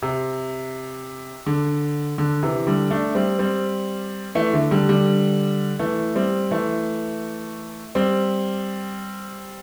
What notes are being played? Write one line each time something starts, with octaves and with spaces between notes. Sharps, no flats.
C3
D3
D3
C3 E3
D3 G3
A3 D4
G3 C4
G3 C4
E3 A3
D3
D3 G3
D3 G3
E3 A3
G3 C4
E3 A3
G3 C4